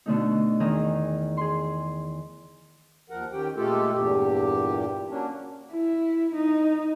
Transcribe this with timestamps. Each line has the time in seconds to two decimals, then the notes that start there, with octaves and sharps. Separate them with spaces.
0.06 B2 D3 A3 D#4
0.60 E2 D#3 D#4 G#4 A#5 D#6
1.37 G#4 C6
3.10 D#2 F3 A#4 F#5
3.32 D#3 C#4 G4 G5
3.56 A#2 G#3 A3 F4 G4 A4
3.91 E2 G2 A#2 G4
5.09 F#3 A#3 C#4 D4
5.72 E4
6.36 D#4